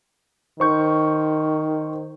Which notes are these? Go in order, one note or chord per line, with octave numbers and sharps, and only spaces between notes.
D#3 C5 C#6 G6